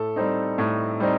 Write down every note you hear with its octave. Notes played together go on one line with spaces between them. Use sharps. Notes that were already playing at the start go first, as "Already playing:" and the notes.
Already playing: A2 A4
G3 C4 D#4
A2
G3 C4 D#4